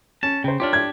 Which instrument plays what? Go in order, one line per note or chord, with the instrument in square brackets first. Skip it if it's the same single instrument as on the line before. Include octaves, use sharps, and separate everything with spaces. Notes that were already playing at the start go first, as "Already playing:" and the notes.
[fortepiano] C#4 [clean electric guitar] A5
[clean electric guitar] C#3 [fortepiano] C5 G5
[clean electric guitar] D4 G4 [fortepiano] F4 C#5 F6
[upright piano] G#6